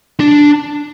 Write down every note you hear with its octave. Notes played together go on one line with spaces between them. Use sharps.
D4